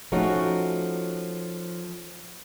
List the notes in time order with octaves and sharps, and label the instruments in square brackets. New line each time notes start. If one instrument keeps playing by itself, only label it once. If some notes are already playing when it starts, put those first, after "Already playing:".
[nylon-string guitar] F3 A3 C#4 D#4 F#4